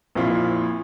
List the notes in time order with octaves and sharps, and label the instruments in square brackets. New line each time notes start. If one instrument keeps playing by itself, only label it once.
[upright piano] A#1 F2 A#2 E4 F4